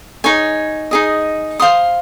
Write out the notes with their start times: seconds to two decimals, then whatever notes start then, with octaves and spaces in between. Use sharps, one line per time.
0.24 D#4 G#4 C#5 G#5
0.91 D#4 G#4 D#5
1.60 C5 F5 C6 D#6